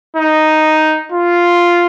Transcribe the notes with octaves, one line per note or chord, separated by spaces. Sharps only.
D#4
F4